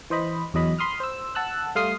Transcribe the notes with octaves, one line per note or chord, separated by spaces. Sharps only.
E3 C5 D#5 B5
E2 F#3 D#5 B5
B5 C6 D#6 F6
C5 E6
F#5 A5 E6 F#6
G3 A3 F5 C6 D#6 C7